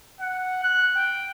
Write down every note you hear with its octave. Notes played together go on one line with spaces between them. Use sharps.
F#5
F#6
G5